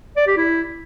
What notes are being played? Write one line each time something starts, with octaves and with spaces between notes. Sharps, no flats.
D5
G4
E4